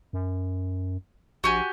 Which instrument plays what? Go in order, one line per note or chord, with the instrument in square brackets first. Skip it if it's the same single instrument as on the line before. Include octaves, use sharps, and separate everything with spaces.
[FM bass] F#2
[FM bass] A#1 [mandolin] F#4 G4 G#5